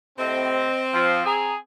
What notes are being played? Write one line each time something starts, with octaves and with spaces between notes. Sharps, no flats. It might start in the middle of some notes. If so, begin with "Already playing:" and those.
A2 C3 C4 D#5
F3 F6
G#4 A#5